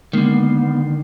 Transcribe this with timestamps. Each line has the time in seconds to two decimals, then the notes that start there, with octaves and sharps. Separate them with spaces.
0.13 D3 D#3 G#3 A#3 B3 C7